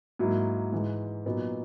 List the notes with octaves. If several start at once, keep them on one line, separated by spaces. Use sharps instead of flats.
G#2 F#3 A#3 E4
G#2 E3 G#3
A#2 F#3 B3 D#4